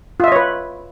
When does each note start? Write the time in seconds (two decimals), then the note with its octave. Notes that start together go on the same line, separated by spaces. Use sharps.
0.20 F4
0.24 E5
0.28 D#5
0.32 C#5
0.36 B4